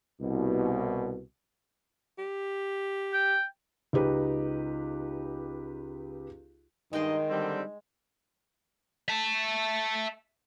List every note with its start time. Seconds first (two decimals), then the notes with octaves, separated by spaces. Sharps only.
0.22 C2 B2
2.18 G4
3.13 G5
3.93 C#2 D#4 G4 B4
6.93 G2 D#3 G#3 D#4 D#5 G5 C6
7.30 D3 G3 C4
9.09 E5 A5